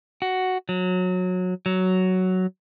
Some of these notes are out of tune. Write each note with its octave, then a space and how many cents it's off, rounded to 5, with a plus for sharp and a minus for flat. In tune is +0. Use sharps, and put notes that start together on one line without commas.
F#4 +5
F#3 -20
F#3 +5